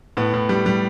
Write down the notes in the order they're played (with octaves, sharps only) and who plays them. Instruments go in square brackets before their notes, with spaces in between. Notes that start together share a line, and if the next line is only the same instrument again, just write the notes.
[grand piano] A2 B3
A2
G3
G3